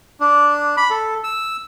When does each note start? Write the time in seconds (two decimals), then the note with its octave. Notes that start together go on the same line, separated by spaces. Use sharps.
0.20 D4
0.77 B5
0.90 A4
1.24 E6